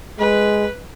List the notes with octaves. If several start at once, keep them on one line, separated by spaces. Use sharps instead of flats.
G#3 B4